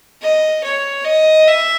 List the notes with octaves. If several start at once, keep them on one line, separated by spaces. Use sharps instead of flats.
D#5
C#5
D#5
E5